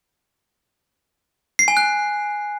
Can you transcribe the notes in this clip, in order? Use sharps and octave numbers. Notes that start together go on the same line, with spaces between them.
C7
G#5
F#6